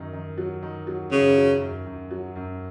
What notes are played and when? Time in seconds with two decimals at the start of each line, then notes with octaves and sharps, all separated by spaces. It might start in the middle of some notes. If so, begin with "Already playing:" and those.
Already playing: F#2 D#3
0.13 D#3
0.38 F#3
0.63 D#3
0.87 F#3
1.12 F#2 C#3
1.37 F#3
1.61 F#2
1.86 F#2
2.11 F#3
2.35 F#2